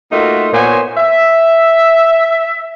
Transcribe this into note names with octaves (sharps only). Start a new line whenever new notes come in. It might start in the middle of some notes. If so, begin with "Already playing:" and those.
A3 A#3 D#4 F4 F#4 E5
A#2 A#3 B3 C5 C#5 G#5
E5